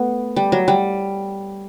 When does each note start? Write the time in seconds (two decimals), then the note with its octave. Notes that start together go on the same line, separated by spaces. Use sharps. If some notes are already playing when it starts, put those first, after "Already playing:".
Already playing: A3 B3
0.36 G3
0.52 F#3
0.68 G3